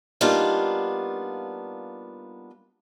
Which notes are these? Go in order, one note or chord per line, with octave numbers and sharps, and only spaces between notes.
G3 A#3 B3 D4 D#4 F4